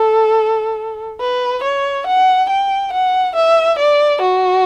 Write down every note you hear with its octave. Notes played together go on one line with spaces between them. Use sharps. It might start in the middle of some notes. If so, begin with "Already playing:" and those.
Already playing: A4
B4
C#5
F#5
G5
F#5
E5
D5
F#4